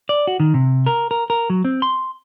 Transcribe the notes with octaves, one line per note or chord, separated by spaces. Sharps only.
D5
F#4
D#3
C3
A#4
A#4
A#4
F#3
C4
C6